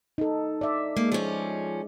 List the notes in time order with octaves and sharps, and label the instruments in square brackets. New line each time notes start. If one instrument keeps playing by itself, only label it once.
[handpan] D#4 A4
D5 E5
[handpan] G#3 [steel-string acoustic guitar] A#3
[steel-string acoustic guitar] F3 C#4